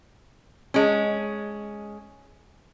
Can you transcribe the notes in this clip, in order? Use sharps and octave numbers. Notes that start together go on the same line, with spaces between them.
G#3 C#4